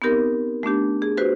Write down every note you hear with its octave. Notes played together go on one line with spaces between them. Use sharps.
B3 C4 D#4 G4 A#4
A3 B3 D4 G4
G#4
F#4 G4 B4 C5